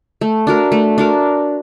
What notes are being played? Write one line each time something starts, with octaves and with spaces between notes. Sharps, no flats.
A3
D4 F#4 A#4
A3
D4 F#4 A#4